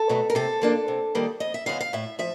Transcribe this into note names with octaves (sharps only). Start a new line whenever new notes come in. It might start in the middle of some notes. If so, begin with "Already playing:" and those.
Already playing: A4
B2 F#3 A3
A#4
C3 A4
F3 A#3 D4
C3
D#3 G3 A#3
F2 D#5
E5
C#3 E3 G#3 B3 F5
F5
A2 E5
F3 E5